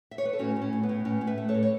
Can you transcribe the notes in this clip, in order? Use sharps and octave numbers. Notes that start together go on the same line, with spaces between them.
E5
C#5
B4
A4
A2 C#4 F#4
A2
C#4
A2
B3
A2
A2 C#4
A2
B4 E5
A3
A4 C#5
A2
C#5